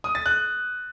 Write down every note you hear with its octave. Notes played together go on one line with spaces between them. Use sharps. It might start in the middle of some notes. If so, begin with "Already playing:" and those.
D#6
A6
F#6